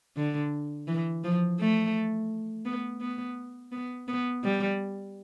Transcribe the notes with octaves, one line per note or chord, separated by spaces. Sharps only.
D3
E3
F3
A3
B3
B3
B3
B3
G3